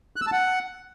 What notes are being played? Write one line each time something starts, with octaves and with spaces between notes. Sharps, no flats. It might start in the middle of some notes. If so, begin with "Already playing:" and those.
F#6
E6
A5
F#5